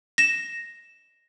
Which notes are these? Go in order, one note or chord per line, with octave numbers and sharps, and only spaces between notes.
A#6 E7